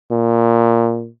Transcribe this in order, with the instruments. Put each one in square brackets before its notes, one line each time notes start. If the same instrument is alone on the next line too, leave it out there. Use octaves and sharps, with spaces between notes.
[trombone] A#2